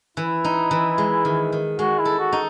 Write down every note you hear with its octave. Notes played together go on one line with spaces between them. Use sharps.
E3 E4
D#4
E3
G#3
D#3
D#3
G#3 F#4
E4
A4
F#4
D#4